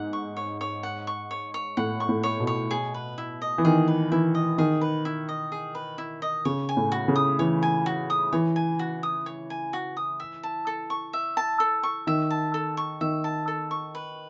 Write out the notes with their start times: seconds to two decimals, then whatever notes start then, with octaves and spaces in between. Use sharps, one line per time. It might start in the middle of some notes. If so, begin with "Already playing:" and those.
Already playing: G#2 F#5
0.13 C#6
0.37 C#5
0.61 C#5
0.83 F#5
1.07 C#6
1.31 C#5
1.54 C#5
1.77 A2 F#5
2.00 C#6
2.09 A2
2.23 C#5
2.40 B2
2.47 C#5
2.71 G#4
2.94 B4
3.18 E4
3.42 D#5
3.58 E3
3.65 D#3 G#4
3.88 B4
4.12 E3 E4
4.35 D#5
4.58 D#3 G#4
4.81 B4
5.05 E4
5.29 D#5
5.52 G#4
5.75 B4
5.98 E4
6.22 D#5
6.45 C#3 C#5
6.69 G#5
6.77 A2
6.92 F#4
7.08 C#3
7.16 D#6
7.39 E3 C#5
7.63 G#5
7.86 F#4
8.10 D#6
8.33 E3 C#5
8.56 G#5
8.79 F#4
9.03 D#6
9.26 C#5
9.50 G#5
9.73 F#4
9.97 D#6
10.20 E5
10.43 A5
10.67 A4
10.90 C#6
11.13 E5
11.37 A5
11.60 A4
11.83 C#6
12.07 D#3 E5
12.31 A5
12.54 A4
12.77 C#6
13.01 D#3 E5
13.24 A5
13.48 A4
13.71 C#6
13.95 B4